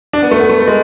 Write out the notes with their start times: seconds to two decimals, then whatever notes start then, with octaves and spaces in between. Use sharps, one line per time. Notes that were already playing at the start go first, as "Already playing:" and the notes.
0.13 D4
0.22 B3
0.31 A3
0.40 B3
0.49 A3
0.60 A3
0.67 G#3